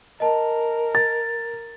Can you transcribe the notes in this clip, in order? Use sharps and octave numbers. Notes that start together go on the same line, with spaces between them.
A#4 D#5 A5
A6